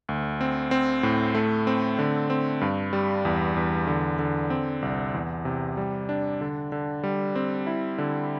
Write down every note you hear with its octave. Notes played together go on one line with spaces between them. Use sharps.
D2
C4
C4
A2
A3
C4
D3
C4
G2
G3
E2
E2
D3
D3
C4
C2
E2
C3
G3
D4
D3
D3
G3
C4
E4
D3